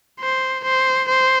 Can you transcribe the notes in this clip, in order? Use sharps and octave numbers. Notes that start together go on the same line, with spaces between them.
C5
C5
C5